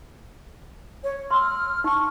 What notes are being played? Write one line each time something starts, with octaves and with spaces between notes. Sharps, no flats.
C#5
C6 E6 F6
D#4 A5 C#6